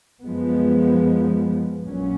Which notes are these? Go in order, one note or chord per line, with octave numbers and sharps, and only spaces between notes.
F#2 F3 G#3 B3
A#1 A#2 F#3 C#4